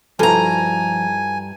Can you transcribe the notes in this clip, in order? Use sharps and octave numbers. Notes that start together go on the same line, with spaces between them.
G2 F3 E4 F#4 A4 G#5 A#5